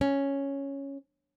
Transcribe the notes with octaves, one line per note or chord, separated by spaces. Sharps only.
C#4